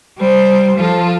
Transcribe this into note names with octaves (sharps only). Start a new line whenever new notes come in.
G3 C5
F3 F4 A4